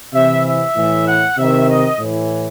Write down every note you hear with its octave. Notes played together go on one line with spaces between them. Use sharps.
C3 E3 E5
E5
A2 E3
F#5
C3 D#3 E5
D#5
A2 E3